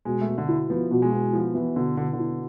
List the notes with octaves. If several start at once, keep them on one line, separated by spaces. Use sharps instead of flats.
B2 G#3
A3
B2
D3
E4
F3 B3
B2
G#3
B2
F3 E4
E3 B3
B2 D3
B2 D3
D3
E4